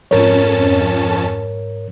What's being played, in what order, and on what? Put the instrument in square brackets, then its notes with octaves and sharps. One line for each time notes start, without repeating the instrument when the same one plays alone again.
[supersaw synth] F2 C#4 A5 [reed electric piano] G#2 A#4 C#5